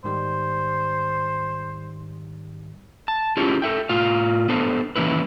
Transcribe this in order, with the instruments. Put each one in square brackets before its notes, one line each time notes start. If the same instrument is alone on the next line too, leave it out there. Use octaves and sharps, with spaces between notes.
[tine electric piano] G#2 D#3 G3 [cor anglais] C5
[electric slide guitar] A5
C#4 E4 F4 G4 G#4 C#5
A4 E5 G5
A2 F4 F5
B3 D4 A4 C5
D#3 E3 A#3 C#4 E4 B4